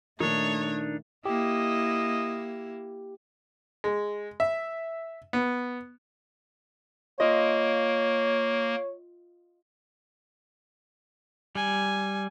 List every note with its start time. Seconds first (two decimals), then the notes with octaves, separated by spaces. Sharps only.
0.20 A#2 D#3 A3 D4 D#4 C#5
1.25 A#3 E4 G4 D#5
3.84 G#3
4.40 E5
5.33 B3
7.20 A#3 F4 C#5 D#5
11.55 G3 G#5